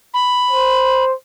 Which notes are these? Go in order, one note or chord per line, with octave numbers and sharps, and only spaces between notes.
B5
C5